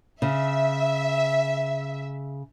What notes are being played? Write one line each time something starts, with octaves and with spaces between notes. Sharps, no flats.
C#3 E5